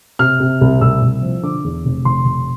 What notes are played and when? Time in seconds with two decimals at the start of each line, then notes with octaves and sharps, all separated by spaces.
0.19 C3 F6
0.40 C3
0.61 C2
0.81 C2 E6
1.02 C2
1.22 F3
1.43 D3 D6
1.64 E2
1.85 F1
2.05 F1 C6
2.25 F1